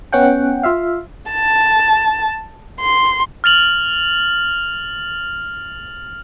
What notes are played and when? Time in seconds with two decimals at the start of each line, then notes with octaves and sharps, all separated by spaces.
0.13 B3 C#4 F#5 G5
0.63 F4 E5 F5
1.31 A5
2.80 C6
3.44 F6 A6 F7 F#7